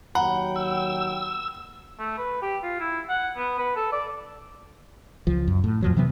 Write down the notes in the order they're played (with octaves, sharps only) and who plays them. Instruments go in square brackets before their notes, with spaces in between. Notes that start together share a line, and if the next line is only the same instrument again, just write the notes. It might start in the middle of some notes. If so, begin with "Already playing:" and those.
[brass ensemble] D#2 F#3 G5 [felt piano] F#5 [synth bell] A#5 B5
[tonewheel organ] E6
[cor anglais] A3
B4
G4
F4
E4
F#5
B3
B4
A4
D5
[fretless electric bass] C#2 F3
F#2
A2
E2 F3 F#3
C3 E3 F#3 B3